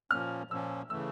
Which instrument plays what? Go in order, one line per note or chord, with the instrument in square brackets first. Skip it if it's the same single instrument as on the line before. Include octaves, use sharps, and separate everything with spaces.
[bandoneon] A#2 F3 A#3 C#4 [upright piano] F6
[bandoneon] A#2 F3 A#3 C#4 [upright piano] E6
[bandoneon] C#3 E3 A3 [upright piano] E6